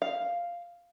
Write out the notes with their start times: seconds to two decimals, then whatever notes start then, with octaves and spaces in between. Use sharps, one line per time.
0.02 F5